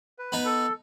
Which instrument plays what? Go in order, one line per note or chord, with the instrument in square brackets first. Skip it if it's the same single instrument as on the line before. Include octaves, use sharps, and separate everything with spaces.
[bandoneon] B4
[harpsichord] B3 D#4
[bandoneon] A4